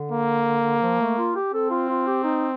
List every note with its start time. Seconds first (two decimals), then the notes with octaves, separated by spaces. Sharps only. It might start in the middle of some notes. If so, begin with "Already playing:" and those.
Already playing: D3
0.12 A#3
0.82 F3
1.01 A3
1.18 F4
1.36 G4
1.53 C4 A4
1.71 F4
1.89 F4
2.07 G4
2.24 D#4